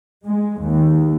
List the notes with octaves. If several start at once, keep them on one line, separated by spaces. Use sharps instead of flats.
G#3
D#2